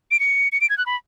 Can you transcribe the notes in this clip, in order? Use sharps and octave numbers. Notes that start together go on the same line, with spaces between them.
D7
C#7
C#7
D7
G#6
F#6
B5